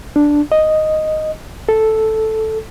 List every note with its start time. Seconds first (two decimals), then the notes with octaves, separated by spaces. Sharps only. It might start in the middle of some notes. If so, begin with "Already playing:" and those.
0.16 D4
0.52 D#5
1.69 A4